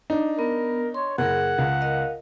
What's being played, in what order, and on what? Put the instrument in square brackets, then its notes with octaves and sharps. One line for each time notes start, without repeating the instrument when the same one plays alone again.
[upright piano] D4 D#4
[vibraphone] B3 [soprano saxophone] A#4
[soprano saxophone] C#5 [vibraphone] C6
[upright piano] F#1 [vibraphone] G#4 A#4 [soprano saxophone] F#5
[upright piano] C#2
[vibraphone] A#4 D#5 F5